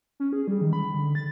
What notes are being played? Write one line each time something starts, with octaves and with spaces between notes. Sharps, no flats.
C#4
G#4
G3
D#3
B5
D3
A6